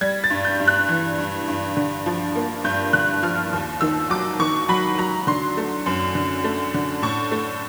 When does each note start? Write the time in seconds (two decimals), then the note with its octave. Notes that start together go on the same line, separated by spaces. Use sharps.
0.01 G3 G#6
0.24 A6
0.30 G2
0.45 G6
0.60 G2
0.68 F#6
0.89 E3
1.18 G2
1.48 G2
1.77 D3
2.06 F3
2.35 A#3
2.64 G2 G6
2.93 D3 F#6
3.23 F3 F6
3.53 D#2
3.81 D#3 E6
4.10 F#3 D6
4.39 D#3 C#6
4.69 F#3 B5
4.98 F#3 A#5
5.27 D3 C6
5.57 A3
5.86 F#2
6.15 D3
6.44 A3
6.74 D3
7.02 A2 C#6
7.32 A3